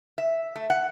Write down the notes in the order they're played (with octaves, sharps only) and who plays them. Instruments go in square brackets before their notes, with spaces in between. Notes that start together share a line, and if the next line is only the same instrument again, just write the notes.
[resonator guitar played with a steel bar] E5
A3
F#5